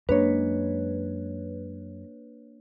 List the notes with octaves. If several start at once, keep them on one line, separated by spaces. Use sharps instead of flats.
F#2 G#3 A#3 D4 B4 C#5